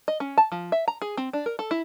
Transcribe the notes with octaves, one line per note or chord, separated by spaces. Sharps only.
D#5
C#4
A5
F3
E5
A#5
G#4
C4
D4
A#4
A4
E4